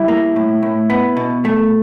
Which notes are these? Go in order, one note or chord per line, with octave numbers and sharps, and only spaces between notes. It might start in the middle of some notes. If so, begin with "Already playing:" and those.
Already playing: G3 E4
A#3
A2
A2
B3
B2
A3